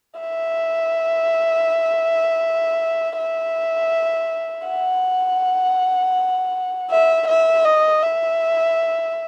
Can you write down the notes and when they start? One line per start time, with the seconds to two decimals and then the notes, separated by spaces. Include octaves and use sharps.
0.20 E5
3.18 E5
4.67 F#5
6.91 E5
7.28 E5
7.65 D#5
8.03 E5